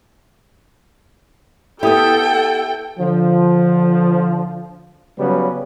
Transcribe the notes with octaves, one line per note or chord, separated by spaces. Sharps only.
B3 E4 G4 A4 G5 D#6
D3 F3
C#3 F#3 G3 B3 B4